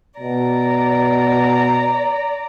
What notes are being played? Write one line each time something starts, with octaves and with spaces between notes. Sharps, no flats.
B2 D5 A#5